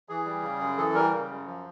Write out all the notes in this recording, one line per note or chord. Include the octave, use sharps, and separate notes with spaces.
E3 G#4
G3
C#3
F#2
E3 A4
G3 A#4
C#3
F#2
F3